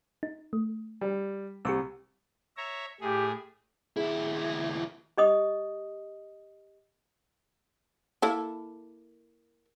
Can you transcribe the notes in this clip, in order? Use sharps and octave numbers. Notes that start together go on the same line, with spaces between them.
D#4
A3
G3
C2 G4 C#6 E6
C#5 E5 A#5
A2 G4 G#4
D#2 E4 G#4 E5
G4 D#5 D#6
A#3 E4 A4